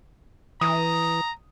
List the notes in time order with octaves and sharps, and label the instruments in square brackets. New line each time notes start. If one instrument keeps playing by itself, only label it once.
[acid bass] E3 [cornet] A#5 [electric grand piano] D#6